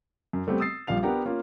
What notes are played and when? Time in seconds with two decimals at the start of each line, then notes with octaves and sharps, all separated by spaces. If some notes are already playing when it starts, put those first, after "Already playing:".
0.33 F#2
0.47 G3 A3 B3 C4 G4
0.60 D#6 E6 A6 C7
0.87 A#1 G3 F5 F7
1.03 B3 D4 G4 A#4 F#5
1.26 A#3 C#4 F4